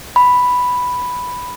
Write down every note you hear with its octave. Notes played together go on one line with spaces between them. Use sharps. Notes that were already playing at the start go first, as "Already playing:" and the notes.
B5